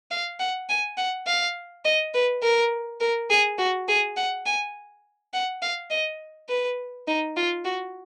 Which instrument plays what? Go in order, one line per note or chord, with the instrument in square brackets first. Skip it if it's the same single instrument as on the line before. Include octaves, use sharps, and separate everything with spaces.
[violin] F5
F#5
G#5
F#5
F5
D#5
B4
A#4
A#4
G#4
F#4
G#4
F#5
G#5
F#5
F5
D#5
B4
D#4
F4
F#4